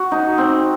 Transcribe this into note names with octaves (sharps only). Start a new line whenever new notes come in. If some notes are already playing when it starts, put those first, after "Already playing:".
Already playing: F#4
D#4
C4